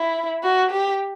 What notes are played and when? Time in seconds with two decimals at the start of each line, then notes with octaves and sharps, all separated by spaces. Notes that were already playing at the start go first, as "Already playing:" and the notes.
Already playing: E4
0.43 F#4
0.71 G4